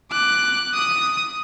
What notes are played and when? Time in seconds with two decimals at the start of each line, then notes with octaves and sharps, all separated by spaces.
0.11 D6 F#6
0.74 D#6